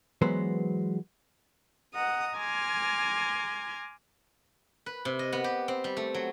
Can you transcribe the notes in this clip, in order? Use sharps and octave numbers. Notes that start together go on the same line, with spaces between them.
E3 F#3 G#3 B3 B4 C5
D#5 F#5 A#5 D#6
G#5 A#5 C6 D6 F6 G#6
B4
C3
D#5
B3
G4
C4
G3
A3
F#3